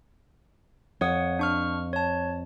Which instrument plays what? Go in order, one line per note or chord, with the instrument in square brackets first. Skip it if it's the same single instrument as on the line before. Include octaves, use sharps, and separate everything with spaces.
[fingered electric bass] F2 [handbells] C#5 F#5 D#6
[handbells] D4 C#6 F6
C#5 A5